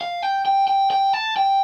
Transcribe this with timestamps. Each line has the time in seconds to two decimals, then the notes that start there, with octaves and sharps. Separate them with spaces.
0.01 F5
0.23 G5
0.46 G5
0.68 G5
0.91 G5
1.13 A5
1.37 G5